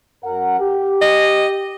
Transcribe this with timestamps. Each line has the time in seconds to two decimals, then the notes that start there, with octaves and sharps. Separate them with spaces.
0.24 F#2 A#4 F#5
0.60 G4
1.02 D#5